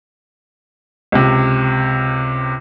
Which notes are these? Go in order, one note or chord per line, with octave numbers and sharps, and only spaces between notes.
C#2 C3